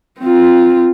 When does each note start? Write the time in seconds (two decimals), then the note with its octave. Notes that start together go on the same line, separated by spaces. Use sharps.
0.21 C4 F4